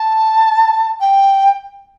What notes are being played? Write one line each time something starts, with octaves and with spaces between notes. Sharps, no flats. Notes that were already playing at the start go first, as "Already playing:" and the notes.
Already playing: A5
G5